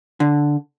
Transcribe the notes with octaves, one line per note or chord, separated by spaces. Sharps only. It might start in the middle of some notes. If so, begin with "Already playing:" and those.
D3